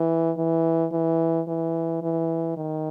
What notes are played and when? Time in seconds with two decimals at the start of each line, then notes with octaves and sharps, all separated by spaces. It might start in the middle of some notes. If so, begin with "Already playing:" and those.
Already playing: E3
0.37 E3
0.92 E3
1.48 E3
2.02 E3
2.57 D#3